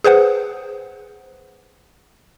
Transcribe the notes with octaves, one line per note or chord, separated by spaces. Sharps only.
G#4 B4 C5 F#5